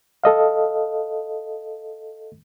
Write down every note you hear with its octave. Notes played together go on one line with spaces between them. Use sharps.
A4 D#5 F5